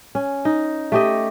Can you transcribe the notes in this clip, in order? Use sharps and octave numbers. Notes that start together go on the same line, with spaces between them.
C#4
D#4
A3 G4 D#5